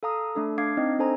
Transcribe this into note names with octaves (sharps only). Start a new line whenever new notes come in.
A4 F5 A#5 D#6
A3 D4 A4
D4 F5 D6 G#6 C7
C4 D#4 D#5
D4 A4 C5 G#5 A#5